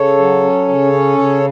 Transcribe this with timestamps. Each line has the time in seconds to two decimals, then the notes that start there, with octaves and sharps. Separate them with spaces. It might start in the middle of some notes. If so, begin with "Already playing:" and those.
Already playing: C#3 A4 C#5
0.18 F#3
0.43 C#4
0.68 C#3
0.93 C#4
1.18 C#3